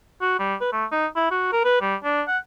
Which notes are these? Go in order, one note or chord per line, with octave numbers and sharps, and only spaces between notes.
F#4
G3
B4
A3
D#4
E4
F#4
A#4
B4
G3
D4
F#5